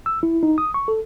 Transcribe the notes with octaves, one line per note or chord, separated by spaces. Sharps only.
E6
E4
D#4
D#6
C#6
A4